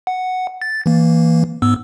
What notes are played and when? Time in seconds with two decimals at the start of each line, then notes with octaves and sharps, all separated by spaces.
0.07 F#5
0.62 A6
0.86 E3 A#3
1.62 G#2 B3 E6